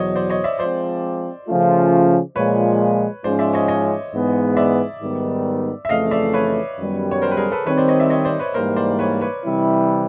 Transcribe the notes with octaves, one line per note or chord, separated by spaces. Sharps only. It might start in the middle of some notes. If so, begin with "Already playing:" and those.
Already playing: E2 B2 F#3 C5 C#5 D#5
C5 D5
C#5 D#5
D5 E5
F3 G#3 C4 C5 D5
C#3 F3 A3 C#4 F4
A#2 F3 G#3 B4 C#5
G#2 F3 G#3 C#4 C5 D5
D5 E5
C#5 D#5
C#5 D#5
G#2 E3 G#3 B3
D5 E5
G#2 D#3 G3 B3
E5
F2 C#3 E3 A3 D#5 F5
D5 E5
B4 C#5
F#2 D#3 G3 B3
C#5
A#4 C5
B4
G#4 A#4
A4 B4
D#3 G3 C4 B4 C#5
C5 D5
C#5 D#5
D5 E5
C#5 D#5
C5 D5
B4 C#5
G#2 E3 G3 A#3 A#4 C5
C5 D5
B4 C#5
B4 C#5
C3 E3 G3 C4 E4